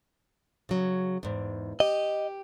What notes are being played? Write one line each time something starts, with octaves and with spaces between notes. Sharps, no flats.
C#3 F#3
E2 G#2
G4 D#5